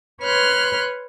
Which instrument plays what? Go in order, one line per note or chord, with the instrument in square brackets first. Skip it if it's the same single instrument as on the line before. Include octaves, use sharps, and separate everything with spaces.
[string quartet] B4 C#5 C6 F6 F#6